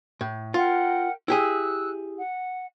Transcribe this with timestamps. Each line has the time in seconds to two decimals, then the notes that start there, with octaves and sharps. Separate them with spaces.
0.21 A2
0.54 F4 A#4 F#5 G5
1.28 E4 G4 G#4 E6 F#6
2.18 F#5